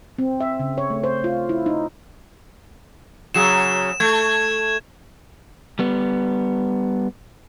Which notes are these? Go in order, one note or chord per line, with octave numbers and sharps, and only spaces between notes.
C4
E5
C#3
C#5
A3
C5
F4
E4
D#4
C#3 F#3 G#4 E7
A3 G#6
G3 B3